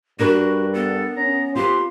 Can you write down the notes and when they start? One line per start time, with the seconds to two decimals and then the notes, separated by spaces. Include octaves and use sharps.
0.19 G2 D4 F#4 A#4 B4
0.74 B3 A4
1.17 C#4 A#5
1.55 C4 F4 G4 B4 C6